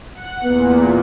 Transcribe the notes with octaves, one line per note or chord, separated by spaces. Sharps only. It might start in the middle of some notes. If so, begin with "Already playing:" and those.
F#5
E2 A#2 B3